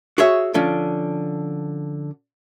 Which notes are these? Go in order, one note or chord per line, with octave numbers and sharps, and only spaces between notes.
F#4 G#4 C#5 E5
D3 F3 C#4